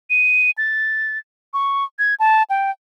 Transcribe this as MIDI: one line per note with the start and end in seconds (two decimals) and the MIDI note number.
0.10 0.51 99
0.58 1.18 93
1.54 1.84 85
1.99 2.15 92
2.20 2.43 81
2.50 2.71 79